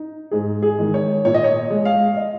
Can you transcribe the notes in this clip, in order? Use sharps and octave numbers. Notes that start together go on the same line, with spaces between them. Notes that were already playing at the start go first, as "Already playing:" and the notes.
Already playing: D#4
G#2 G#4
G#4
D#3 G#3
C#5
A#2 C#5
D#5
C#5
G#3
F5
D#5